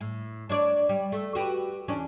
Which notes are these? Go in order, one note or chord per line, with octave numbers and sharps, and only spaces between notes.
A2
D4 C#5 D5
G3
A3
F#4 G4 B4
E2 C#4 D4